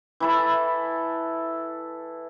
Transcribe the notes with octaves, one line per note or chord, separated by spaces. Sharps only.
E3 E4 A4